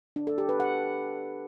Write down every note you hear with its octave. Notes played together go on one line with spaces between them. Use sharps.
D4
A4
G4
B4
F#5